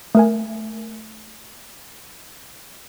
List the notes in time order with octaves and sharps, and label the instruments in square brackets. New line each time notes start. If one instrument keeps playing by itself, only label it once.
[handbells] A3 A#4 G#5